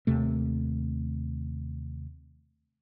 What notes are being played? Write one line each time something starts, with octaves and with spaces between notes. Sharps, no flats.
D#2 C3 A3